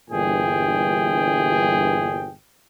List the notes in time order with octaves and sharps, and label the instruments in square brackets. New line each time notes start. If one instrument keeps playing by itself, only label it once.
[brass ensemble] G1 G2 A#2 E3 G#4 G5